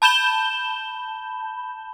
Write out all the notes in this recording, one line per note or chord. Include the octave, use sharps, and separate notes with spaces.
A5 B5 G6 E7 G7